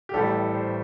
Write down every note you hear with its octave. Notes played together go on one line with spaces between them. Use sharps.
G4
A1 A2 E3 G3 A4
C5